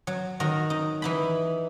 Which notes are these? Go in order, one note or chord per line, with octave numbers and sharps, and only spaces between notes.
F#3
D#3 F#4 A#5
D#4
E3 D#4 B5